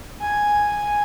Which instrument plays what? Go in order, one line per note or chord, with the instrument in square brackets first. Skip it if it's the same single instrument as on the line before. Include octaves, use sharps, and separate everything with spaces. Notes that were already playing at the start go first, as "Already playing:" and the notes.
[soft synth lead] G#5